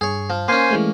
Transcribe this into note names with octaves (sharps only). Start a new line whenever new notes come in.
G2 G#4 C#5
F3
A#3 C#4 C5 G#5 C6
E3 G#3 A3